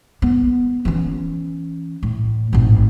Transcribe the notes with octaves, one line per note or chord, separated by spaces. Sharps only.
B3
E3 C#4
A2
G#1 A2